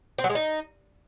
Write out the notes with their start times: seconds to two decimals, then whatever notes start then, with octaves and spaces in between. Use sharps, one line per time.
0.19 C4
0.24 F#3
0.30 G#3
0.35 D#4